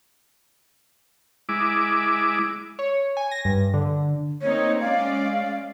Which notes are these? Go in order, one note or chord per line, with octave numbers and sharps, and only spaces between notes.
G#3 E4 D6
C#5
G#5
A#6
G2
D3
A#3 C4 D#4 C#5
G#3 C#4 D5 F5